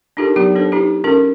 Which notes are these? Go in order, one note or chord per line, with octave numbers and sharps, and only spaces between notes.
D4 D#4 F4 G4 A4 A#4
F#3 B3 D#4 G4
D4 A4 C5
D#4 E4 G4 B4
C#4 F4 A4 A#4